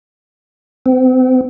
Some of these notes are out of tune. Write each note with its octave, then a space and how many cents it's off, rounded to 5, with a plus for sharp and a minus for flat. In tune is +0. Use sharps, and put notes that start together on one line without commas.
C4 -35